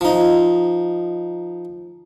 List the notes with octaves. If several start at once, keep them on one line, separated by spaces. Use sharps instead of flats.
F3 D#4